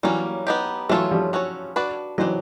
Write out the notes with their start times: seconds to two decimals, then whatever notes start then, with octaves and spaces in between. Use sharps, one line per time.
0.03 E3 F#3 G3 A#3 C#4
0.47 B3 D#4 G4
0.89 E3 F#3 A3 D4 F4 A4 C#5
1.11 F3 G3
1.33 C#4 F#4 A4 C#5
1.76 D4 F#4 B4 D5
2.18 E3 F#3 D4 G4 C5 D#5